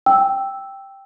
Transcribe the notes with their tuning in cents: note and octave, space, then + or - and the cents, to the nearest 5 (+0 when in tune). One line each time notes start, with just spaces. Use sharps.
G5 +0 E6 +0